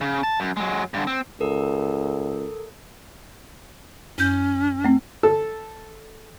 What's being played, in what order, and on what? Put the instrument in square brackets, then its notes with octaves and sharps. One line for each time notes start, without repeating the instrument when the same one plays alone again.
[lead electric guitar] C#3
A5
F#2
F#3 G#3
G2 D3
C4
[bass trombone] C#2 [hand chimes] A4 A#4
[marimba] F#2 G6 [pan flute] C#4
[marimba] A3 C4
[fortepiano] A4